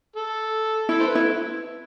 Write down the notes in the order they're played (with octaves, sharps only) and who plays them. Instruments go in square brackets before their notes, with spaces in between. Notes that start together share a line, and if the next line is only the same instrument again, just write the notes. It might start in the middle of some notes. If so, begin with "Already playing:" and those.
[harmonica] A4
[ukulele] E4 [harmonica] A4
[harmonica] C5
B4
[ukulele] E4